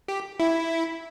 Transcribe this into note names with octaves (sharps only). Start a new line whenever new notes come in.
G4
E4